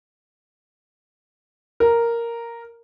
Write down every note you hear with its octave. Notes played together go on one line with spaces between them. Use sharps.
A#4